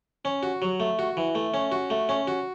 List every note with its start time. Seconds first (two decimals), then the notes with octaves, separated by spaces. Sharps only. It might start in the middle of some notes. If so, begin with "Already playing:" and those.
0.25 C#4
0.43 F#4
0.62 F#3
0.80 A3
0.99 F#4
1.17 E3
1.35 A3
1.54 C#4
1.72 F#4
1.90 A3
2.09 C#4
2.27 F#4